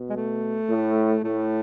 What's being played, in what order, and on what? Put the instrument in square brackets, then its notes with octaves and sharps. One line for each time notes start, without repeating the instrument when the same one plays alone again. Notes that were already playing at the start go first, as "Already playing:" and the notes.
Already playing: [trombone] B2
[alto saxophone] G#3
A3
[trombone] A2
[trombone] A2 [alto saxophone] A3